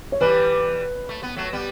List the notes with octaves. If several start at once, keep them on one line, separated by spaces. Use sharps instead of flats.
C#5
E3 G3 B4
A3
B3
F#3 A3
G3 B3